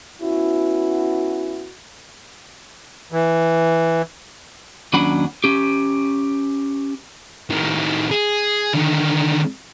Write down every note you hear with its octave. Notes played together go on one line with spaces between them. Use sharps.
B3 C#4 E4 F#4
E3
D#2 F#3 C#4 D4 F#5 B5
C#4 G4
A2 D#3
G#4
D3 D#3